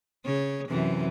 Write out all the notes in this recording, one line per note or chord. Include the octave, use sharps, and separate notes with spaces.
C#3 C#5
F#2 C3 E3